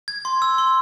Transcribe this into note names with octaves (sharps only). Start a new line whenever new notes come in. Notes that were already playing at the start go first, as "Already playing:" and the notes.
G#6
C6
E6
C6